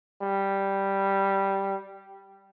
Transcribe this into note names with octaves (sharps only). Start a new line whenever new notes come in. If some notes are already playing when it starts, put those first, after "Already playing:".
G3